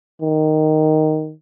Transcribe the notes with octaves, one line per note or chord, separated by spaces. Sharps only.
D#3